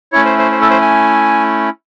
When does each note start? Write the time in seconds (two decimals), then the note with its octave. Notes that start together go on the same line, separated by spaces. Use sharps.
0.12 A3 C#4 E4 C#5
0.25 C5
0.38 C5
0.52 C5
0.61 A4
0.71 C5
0.81 G#5